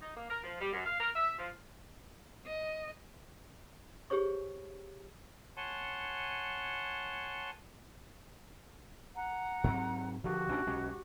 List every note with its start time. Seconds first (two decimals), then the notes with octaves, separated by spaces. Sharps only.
0.02 D#4
0.16 A#3
0.30 A#4
0.43 F3
0.61 G3
0.72 F#2
0.86 F5
1.00 A#4
1.16 E5
1.38 F3
2.47 D#5
4.10 G4 G#4 C5 C#5 C#6
5.57 C#5 F#5 G#5 A5 C6
9.16 F#5 A#5
9.64 G#2 F#3 C4
10.24 D3 F3 F#4 G4
10.49 A1 C#4 D4
10.67 B1 G#3 C#4